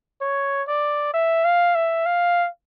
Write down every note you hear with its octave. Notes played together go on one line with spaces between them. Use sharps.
C#5
D5
E5
F5
E5
F5